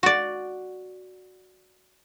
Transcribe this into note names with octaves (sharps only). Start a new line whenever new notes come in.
F#4 D5